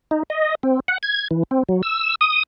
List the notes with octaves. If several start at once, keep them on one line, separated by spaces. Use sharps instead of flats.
D#4
D#5
C4
F#5
G#6
E3
C4
F#3
E6
D#6